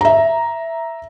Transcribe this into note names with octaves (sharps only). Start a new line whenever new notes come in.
E5 A#5